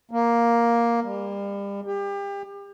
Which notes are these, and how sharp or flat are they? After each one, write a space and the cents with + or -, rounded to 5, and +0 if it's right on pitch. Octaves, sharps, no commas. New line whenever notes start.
A#3 +5
G3 +35
G4 +30